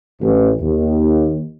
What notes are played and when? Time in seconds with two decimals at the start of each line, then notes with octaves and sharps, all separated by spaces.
0.21 A1
0.61 D#2